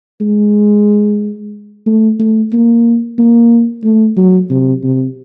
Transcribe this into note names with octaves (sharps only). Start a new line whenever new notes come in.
G#3
A3
A3
A#3
A#3
A3
F#3
C3
C3